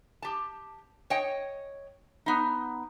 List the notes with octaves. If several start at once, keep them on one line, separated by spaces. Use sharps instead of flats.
G4 A5
C#5 D#5 G5
B3 D#4